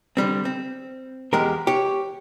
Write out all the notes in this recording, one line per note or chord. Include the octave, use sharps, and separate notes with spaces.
D3 G3 C4
C4
E2 G#3 G4 A#4
G4 C#5